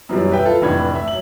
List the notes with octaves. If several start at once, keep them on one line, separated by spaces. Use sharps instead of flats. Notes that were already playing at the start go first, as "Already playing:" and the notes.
F#2 B2 E3 F#3 G3
B4 E5 G5
F4 A4 B4
F1 A2 E3 D4 B5 G#6
E5
F#3 F#7